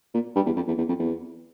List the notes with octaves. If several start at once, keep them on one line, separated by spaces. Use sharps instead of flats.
A#2
G2
E2
F2
E2
E2
F2
E2